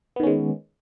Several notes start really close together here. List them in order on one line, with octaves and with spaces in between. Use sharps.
B3 D#3 C#4 G#3